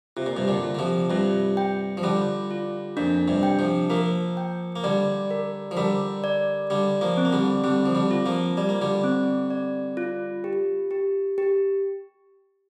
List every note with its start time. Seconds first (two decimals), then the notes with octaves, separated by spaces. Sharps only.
0.17 C3 F4
0.26 A#2
0.36 G2 C3
0.48 A#2 D3
0.63 F4
0.75 D3
0.79 C3 F3
1.10 G2 C3 F4
1.57 G5
1.97 F3
2.03 D3 G3 F4
2.51 F4
2.97 F2 A#2 D4
3.28 G2 C3
3.43 G5
3.59 C3 F3
3.90 F3 A#3 A#4
4.37 G5
4.76 A#3
4.84 D3 G3 D5
5.31 A#4
5.71 F3
5.77 D3 G3 A#4
6.24 D5
6.70 D3 G3 D5
7.01 F3 A#3
7.17 C4
7.25 A#3
7.33 D3 G3
7.64 D3 G3 C4
7.86 F3
7.95 D3 G3
8.11 F4
8.26 F3 A#3
8.57 G3 D5
8.69 A#3
8.82 D3 G3
9.04 C4
9.50 D5
9.97 F4
10.44 G4
10.91 G4
11.38 G4